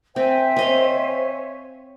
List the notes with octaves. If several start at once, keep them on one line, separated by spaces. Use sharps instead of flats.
C4 C5 E5 G5 G#5
C4 C#5 D#5 F5